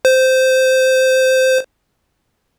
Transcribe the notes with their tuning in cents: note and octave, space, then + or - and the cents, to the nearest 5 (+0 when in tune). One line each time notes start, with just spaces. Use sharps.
C5 -10